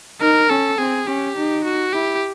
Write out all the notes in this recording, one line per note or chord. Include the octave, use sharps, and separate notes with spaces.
D#4 A#4
C#4 A4
C4 G#4
C#4 G4
D#4
F#4
E4 G4